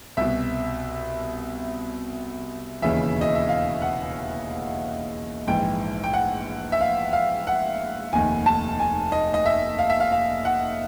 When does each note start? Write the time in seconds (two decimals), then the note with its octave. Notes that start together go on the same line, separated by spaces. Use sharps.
0.17 C2 B2 E5
2.82 E1 D#2 C#3 E3 E5
3.21 D#5
3.35 E5
3.49 F5
3.82 F#5
5.47 A#1 G#2 E3 G5
6.04 G5
6.14 F#5
6.72 E5
6.81 F5
7.13 F5
7.47 F#5
8.13 F1 D#2 D#3 G#5
8.46 A5
8.80 G#5
9.12 D#5
9.34 D#5
9.46 E5
9.79 F5
9.90 E5
10.00 F5
10.12 F5
10.45 F#5